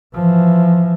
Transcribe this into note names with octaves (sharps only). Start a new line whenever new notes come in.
E3 F3